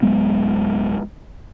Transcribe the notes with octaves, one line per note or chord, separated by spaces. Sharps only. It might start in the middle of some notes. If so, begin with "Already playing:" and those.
D1 F#3 G#3 B3